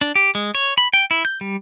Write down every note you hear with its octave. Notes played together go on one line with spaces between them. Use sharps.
D4
G4
G#3
C#5
B5
G5
E4
G6
G3